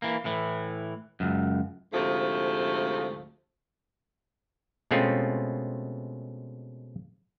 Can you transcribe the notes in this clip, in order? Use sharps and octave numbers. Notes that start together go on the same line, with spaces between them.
E3 A#3
A2 E3
C#2 F#2
D2 G#2 C3 F3 A3
B2 G#3 A3 C4 C#4 F4